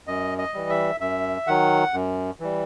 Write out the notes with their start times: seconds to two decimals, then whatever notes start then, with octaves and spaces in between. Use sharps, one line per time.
0.07 F#2 D#5
0.38 D#5
0.54 E3 G3
0.69 E5
1.00 F#2 E5
1.47 D#3 F#3 F#5
1.94 F#2
2.40 E3 G3